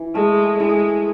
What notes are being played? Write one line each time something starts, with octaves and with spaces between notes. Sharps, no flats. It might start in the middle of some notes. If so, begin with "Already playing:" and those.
Already playing: E3
G#3 A3
G#3 E4